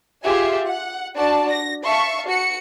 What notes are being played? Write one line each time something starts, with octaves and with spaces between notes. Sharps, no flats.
F4 G4 G#4 E5 G#5
F#5
D4 F#4 D5 A5
A#6
E5 F5 A5 C#6
F#4 C#7